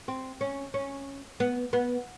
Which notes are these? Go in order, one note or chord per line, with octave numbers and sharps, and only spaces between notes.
C4
C#4
C#4
B3
B3